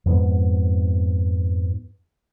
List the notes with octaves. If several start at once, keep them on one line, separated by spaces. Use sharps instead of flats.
F2 G#2 B3